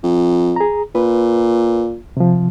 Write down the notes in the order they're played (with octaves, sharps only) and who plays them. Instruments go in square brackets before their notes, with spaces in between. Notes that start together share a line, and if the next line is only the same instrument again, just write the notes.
[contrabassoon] F2
[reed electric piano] G#4 A#5
[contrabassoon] A#2 [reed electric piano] B4
[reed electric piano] C3 F3